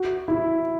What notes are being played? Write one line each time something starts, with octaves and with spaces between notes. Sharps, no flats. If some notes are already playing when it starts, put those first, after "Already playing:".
Already playing: F#4
E4